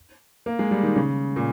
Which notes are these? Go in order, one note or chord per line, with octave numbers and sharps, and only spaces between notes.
A#3
G#3
G3
D#3
C#3
A#2